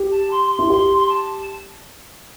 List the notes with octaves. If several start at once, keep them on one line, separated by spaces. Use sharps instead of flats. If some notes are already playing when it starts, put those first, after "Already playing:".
Already playing: G4
A5
C6
C6
E4
G4 C6
C6
A5